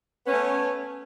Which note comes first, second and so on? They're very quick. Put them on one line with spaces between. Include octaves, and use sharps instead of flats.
B3 C#4 A3